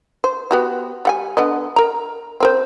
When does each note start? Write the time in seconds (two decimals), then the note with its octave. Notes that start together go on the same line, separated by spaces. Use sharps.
0.24 C5
0.51 B3 F#4 G4
1.05 G3 F#5 G#5
1.37 D3 B3 D#5
1.76 A#4 A#5
2.40 C4 A#4 C5